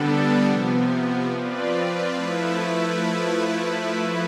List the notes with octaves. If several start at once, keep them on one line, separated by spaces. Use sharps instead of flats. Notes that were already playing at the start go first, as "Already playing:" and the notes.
Already playing: D3 G3 B3 D4 A4
C3 F3 B3
F3 C4 F4 B4 D5
F3 A3 E4 B4